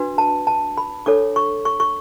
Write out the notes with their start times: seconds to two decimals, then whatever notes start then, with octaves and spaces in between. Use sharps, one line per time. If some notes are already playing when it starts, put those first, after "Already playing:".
Already playing: D4 F#4 B4
0.18 A5
0.47 A5
0.77 B5
1.06 D4 A4 C#5 D6
1.36 C#6
1.65 C#6
1.80 C#6